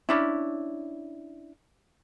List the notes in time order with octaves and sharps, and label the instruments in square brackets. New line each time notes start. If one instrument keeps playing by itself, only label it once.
[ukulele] C#4 D4 E4